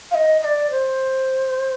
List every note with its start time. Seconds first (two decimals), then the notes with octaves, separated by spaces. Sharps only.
0.11 F5
0.15 D#5
0.41 D#5
0.45 D5
0.71 C5